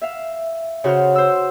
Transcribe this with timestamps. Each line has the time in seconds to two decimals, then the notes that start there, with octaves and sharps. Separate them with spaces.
0.02 E5 F5
0.84 C#3 F#4 C5 F6
1.15 C5 E6